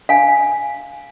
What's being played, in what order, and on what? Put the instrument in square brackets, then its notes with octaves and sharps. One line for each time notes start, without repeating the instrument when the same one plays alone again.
[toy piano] F5 G#5